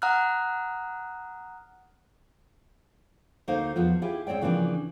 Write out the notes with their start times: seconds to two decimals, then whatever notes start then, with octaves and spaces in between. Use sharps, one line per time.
0.02 F#5 A#5 D#6 F6 F#6
3.48 D2 A#3 D#4 C5 F5
3.76 E2 F3 B3 F4
4.02 E4 F4 G4 G#4
4.27 G#2 C4 C#5 D5 G5
4.41 C#3 E3 F3 A#3 D4